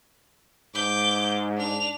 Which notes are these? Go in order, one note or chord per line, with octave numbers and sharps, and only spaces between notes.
G#2 D6 G6
D4 F7